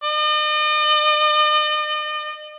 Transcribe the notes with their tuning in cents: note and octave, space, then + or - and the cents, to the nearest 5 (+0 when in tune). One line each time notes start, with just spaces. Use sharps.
D#5 -45